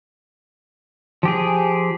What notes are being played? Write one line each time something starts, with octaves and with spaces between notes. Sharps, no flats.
F3 G4 G#4